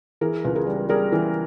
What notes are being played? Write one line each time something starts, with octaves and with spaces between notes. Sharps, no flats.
E3 G#4 A#4
C#2 B4
G#4 A#4
G3
G3 G#4 A#4
E3